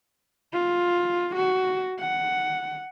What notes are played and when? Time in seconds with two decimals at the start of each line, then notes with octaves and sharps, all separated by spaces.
0.53 F4
1.36 F#4
2.00 F#5